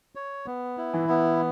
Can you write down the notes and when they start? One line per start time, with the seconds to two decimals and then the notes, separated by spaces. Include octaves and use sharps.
0.15 C#5
0.46 B3
0.78 E4
0.94 E3
1.09 B3